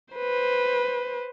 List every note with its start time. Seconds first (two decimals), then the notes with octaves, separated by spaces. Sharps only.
0.15 B4 C5